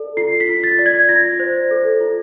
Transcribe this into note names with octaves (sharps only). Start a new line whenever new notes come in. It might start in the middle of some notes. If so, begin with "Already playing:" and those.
Already playing: A4 D5
F4 C7
B6
F4
A6
D5
G#6
F4 A#6
C5
A4
F4